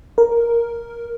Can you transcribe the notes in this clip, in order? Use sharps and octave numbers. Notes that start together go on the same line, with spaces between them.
A#4